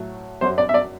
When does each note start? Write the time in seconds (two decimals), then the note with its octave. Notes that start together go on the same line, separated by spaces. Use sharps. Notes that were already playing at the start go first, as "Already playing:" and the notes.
Already playing: A2 F#3
0.41 F#2 F#3 C5
0.58 D5
0.69 E5
0.74 D5